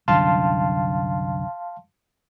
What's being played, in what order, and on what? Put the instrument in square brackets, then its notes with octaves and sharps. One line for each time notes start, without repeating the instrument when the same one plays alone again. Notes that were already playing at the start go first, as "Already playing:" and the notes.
[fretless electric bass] C2 F#2 D3 [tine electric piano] F5 A5 C6